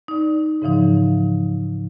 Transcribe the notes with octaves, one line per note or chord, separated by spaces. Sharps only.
D#4 D5
G#2 C#3 E3 F3 D#4